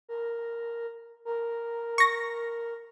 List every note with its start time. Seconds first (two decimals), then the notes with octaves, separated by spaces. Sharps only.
0.09 A#4
1.25 A#4
1.98 C#6 A#6